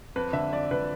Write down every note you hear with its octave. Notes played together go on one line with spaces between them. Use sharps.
F2 B4
D3 E5
F2 D5
D3 B4